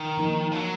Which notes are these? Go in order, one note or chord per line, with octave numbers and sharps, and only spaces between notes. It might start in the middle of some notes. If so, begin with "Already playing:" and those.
Already playing: D#3
F3 A#3 D#4 A#4
F3
F#3